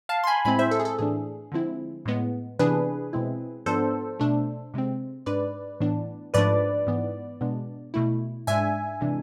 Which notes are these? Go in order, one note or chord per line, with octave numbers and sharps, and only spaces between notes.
F5 A5
C6
G#5 B5
A2 G#3 C4 E4 G#5 B5
C5 E5
A4
G#4
A4
A2 E3 A3 D4 G#4
D3 F3 G#3 C4 E4
A2 G#3 B3
C3 E3 B3 D4 G#4 B4
B2 G#3 C4 E4
G#2 F3 B3 D4 A4 C5
B2 A3 D4
C3 G#3 C4
G#2 G#3 D4 B4 D5
A2 E3 B3 D4
G#2 F3 A3 D4 B4 D5
G#2 E3 B3
B2 G#3 B3 D4
B2 A3 E4
G#2 G#3 D4 E5 G#5
C3 E3 G#3 D4